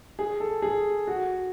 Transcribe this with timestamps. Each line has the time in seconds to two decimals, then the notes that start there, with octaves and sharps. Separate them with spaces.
0.19 G#4
0.40 A4
0.62 G#4
1.07 F#4